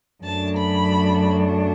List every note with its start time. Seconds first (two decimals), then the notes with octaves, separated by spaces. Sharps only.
0.24 F#2 F#3 A3 D4 A5
0.57 B5